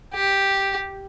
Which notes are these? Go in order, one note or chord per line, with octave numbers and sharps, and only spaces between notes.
G4